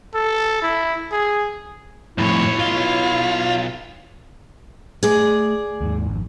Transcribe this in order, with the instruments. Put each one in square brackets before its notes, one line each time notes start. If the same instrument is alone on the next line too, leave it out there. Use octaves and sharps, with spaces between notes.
[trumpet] A4
E4
G#4
[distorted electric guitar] B1 C#5 [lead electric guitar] F2 A2 [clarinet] E4
[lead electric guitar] F4
[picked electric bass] A3 [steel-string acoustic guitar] G#4 D5
[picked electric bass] D#2 G#2
G#1 F2